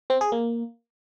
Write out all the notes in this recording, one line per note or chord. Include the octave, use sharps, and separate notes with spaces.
C4
G#4
A#3